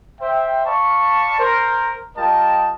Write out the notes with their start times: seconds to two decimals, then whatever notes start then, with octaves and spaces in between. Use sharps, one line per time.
0.21 C5 E5 G5
0.66 D5 F5 A5 B5 C#6
1.39 A#4 C5
2.17 G3 F4 A#4 D#5 G5 A5